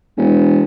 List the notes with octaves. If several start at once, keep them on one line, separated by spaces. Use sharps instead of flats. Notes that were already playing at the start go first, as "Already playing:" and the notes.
E1